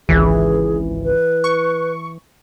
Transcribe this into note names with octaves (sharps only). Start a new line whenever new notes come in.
G#1 C#2 E3 G#4
B4
C#6